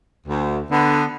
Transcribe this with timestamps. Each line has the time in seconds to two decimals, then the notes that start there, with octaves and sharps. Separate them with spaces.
0.27 D2
0.70 D3 B3